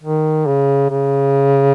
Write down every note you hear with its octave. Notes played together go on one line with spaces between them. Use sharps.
D#3
C#3
C#3